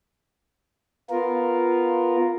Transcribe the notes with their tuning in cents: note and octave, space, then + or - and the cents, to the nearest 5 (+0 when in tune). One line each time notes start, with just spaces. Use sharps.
B3 +0 F4 +0 A#4 +0